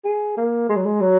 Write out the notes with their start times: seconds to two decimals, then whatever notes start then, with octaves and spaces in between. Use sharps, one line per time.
0.04 G#4
0.37 A#3
0.69 G#3
0.76 F#3
0.85 G#3
1.01 F#3